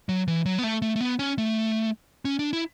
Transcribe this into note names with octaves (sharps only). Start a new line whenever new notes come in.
F#3
E3
F#3
B3
A3
A3
A3
B3
C#4
A3
C#4
D4
E4